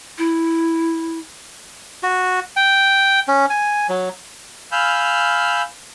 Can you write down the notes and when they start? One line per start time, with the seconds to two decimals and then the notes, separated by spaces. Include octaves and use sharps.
0.18 E4
2.03 F#4
2.56 G5
3.28 C#4
3.50 G#5
3.89 F#3
4.72 F5 G#5 B5 E6 F6 G6